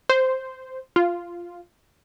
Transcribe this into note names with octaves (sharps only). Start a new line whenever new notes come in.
C5
F4